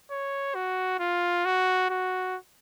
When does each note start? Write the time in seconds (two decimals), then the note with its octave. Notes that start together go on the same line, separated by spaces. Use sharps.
0.11 C#5
0.55 F#4
1.00 F4
1.45 F#4
1.90 F#4